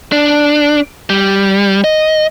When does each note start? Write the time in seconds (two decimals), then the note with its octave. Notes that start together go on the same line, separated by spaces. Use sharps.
0.12 D4
1.10 G3
1.84 D#5